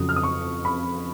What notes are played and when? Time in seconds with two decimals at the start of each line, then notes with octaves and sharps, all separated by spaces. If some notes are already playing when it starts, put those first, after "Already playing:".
Already playing: F2 C#3 F#3 D#6
0.09 F6
0.16 D#6
0.23 C#6
0.65 B5